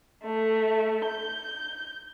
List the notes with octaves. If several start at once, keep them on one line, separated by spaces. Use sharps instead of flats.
A3
G6